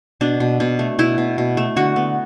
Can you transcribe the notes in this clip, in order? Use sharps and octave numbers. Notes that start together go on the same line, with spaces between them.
B2 D4
B2
B2
A3
B2 E4
B2
B2
A3
D3 F#4
B3